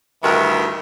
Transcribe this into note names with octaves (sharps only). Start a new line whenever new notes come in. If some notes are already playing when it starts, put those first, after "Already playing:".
D2 G2 D#3 E3